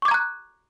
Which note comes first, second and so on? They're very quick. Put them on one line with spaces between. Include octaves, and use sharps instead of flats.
C#6 D6 G#6 A#5 F#6